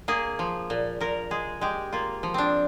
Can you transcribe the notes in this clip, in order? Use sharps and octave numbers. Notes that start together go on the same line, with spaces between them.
A#3 G#4
F3
A#2
A#2 A#4
G#3 G#4
G#3 G4
A#3 F4
F3
C4 D4